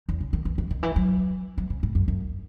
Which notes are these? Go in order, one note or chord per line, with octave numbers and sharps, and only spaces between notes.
E2
C#3
D#3
E3
E3
D#3
E3
F#3
F#3
C#3
A2
F#2
F#2